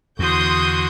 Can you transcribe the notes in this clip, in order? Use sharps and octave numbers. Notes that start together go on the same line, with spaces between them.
E2 D3 F#4 C6 D#6 G6